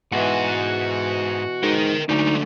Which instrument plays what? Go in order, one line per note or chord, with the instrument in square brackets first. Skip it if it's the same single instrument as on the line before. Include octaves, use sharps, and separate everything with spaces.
[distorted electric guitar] G#2 [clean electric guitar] B2 E3 [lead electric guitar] F#4 F#5
[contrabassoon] G#2 [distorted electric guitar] A#4 G5
[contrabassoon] D2 [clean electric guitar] D3 F3 F#3 [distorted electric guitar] G#3 A3 [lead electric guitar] D#4